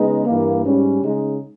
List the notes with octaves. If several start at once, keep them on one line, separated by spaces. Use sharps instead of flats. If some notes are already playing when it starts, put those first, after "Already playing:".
Already playing: C#3 G#3 B3 D#4
G2 E3 A#3
G#2 G3 C#4
C#3 G#3 D#4